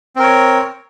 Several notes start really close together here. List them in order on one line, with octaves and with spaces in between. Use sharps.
C4 A#4 C#5